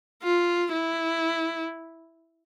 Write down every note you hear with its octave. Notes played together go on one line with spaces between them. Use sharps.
F4
E4